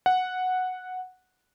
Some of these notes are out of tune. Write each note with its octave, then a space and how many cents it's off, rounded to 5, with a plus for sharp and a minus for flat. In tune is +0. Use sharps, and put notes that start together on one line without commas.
F#5 -5